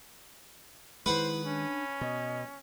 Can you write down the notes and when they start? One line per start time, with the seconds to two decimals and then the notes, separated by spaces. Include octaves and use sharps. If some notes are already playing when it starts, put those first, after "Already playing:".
1.06 D#3 G#3 E4 B4 C5 F#5
1.45 C#4 D4
2.01 B2 D#5